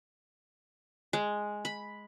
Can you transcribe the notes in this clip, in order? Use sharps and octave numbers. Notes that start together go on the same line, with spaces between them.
G#3
B5